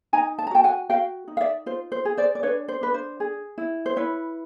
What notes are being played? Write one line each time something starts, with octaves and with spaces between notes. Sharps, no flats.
D#4 G#5 A#5
A5
A#5
F#4 G5 A5
F#5 G#5
F#4 F5 G5
D#4
F5
D5 E5
F4 C5
C5
G#4
C5 D5
D5
D4 B4 C#5
C5
D4 B4
C5
G#4
E4
C5
E4 B4 C#5